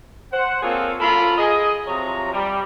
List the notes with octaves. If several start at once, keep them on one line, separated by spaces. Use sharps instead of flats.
C5 F#5
A#3 C4 F4 G#4 A4 C#5
F#2 A#3 F4 A4 A#4 B5
G#4 D#5
C3 F3 F#3 C#5 A#5
G3